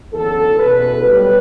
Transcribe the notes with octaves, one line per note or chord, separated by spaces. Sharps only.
F#1 E2 D3 F#3 A4
F#1 E2 B2 B4
B1 A2 G3 B4